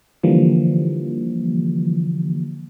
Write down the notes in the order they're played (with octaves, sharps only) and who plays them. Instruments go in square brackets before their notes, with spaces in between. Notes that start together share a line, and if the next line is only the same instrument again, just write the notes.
[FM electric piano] D3 E3 F3 G3 A#3